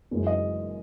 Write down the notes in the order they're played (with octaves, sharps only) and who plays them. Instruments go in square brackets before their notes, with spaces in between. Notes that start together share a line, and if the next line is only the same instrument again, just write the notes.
[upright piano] F#1 F#2 E3 G#3
D#5